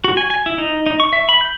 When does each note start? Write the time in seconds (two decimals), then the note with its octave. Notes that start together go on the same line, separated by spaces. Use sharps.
0.04 F#4
0.17 G#5
0.30 G#5
0.46 E4
0.58 D#4
0.86 D#4
1.00 C#6
1.13 E5
1.29 B5
1.41 G6